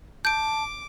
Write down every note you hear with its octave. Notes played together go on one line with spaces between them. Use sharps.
A5 D6 G6 D7